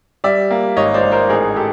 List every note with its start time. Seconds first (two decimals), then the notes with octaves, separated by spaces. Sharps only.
0.24 G3 D5 E5
0.51 A#3
0.76 G#1 C#5 D#5
0.94 C5 D5
1.03 G#1
1.12 A#4 C5
1.29 A1 G#4 A#4
1.56 G4 A4